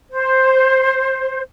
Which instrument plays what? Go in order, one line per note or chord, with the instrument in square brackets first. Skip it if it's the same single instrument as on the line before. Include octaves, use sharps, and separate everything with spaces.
[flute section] C5